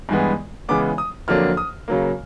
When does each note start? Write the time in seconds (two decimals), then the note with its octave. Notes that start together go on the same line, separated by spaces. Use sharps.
0.09 G2 E3 G#3 B3
0.69 C#3 E3 G#3 B3 D6
0.98 D#6
1.28 F2 D3 F#3 A#3 D4 F6
1.57 D#6
1.88 C#3 F#3 A#3